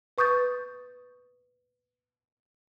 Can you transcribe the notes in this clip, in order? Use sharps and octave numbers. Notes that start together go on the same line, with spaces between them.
B4 C#6 D#6 G6 A6